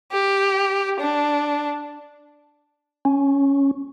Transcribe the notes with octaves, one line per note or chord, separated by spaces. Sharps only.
G4
D4
C#4